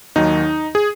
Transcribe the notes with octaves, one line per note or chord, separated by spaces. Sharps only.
D#2 D#3 F#3 D#4
G#4